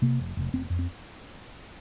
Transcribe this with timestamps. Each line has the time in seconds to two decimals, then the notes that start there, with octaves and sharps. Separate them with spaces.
0.02 C3 A#3
0.20 F1
0.37 F1
0.53 F1 C4
0.70 F2
0.79 C4